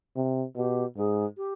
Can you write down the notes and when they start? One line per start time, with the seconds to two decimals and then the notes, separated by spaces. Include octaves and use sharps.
0.16 C3
0.56 B2 G4
0.97 G#2 G#4
1.37 G4